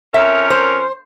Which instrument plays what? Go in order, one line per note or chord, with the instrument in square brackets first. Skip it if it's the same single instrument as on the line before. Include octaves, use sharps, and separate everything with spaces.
[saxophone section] F2 C#4 A#4 [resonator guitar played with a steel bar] E5
[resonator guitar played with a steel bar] C5